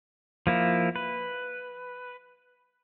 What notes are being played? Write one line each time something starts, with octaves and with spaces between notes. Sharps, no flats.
F3 A#3 E4
B4